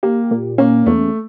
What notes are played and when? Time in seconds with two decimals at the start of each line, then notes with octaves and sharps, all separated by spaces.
0.03 A#3 G4
0.31 A#2
0.58 A#3 C#4
0.86 E2 A3